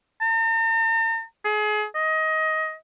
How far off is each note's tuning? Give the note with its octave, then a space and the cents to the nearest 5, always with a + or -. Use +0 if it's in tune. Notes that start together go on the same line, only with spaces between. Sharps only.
A#5 -45
G#4 +30
D#5 +20